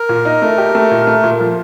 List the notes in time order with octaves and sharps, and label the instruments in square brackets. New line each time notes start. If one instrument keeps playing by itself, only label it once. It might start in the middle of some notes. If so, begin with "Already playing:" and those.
Already playing: [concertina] A#4
[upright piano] A#2
D#4
A3
G4
A3
A#2
A3
A#2
F3